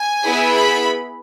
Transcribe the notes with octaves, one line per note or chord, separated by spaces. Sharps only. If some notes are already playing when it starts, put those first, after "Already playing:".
Already playing: G#5
B3 E4 G#4
B5